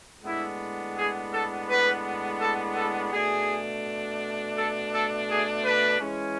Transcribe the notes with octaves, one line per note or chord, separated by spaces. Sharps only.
A2 G#3 B3 D4 E4
G#4
A4
B4
A4
A4
B2 A3 D4 G#4
A4
A4
G#4
B4
E3 G#3 C#4